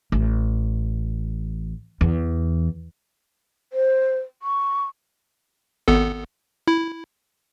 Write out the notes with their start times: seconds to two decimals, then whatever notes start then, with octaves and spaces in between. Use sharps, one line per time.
0.12 A1
2.01 E2
3.73 C5
4.43 C#6
5.88 G#1 B3 A4
6.68 E4